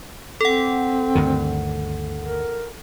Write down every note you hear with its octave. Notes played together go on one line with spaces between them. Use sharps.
C4 A4 F#5
D2 G2 D#3
A#4